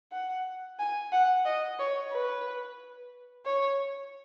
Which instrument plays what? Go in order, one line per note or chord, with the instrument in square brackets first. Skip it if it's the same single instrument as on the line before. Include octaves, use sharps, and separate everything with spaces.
[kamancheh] F#5
G#5
F#5
D#5
C#5
B4
C#5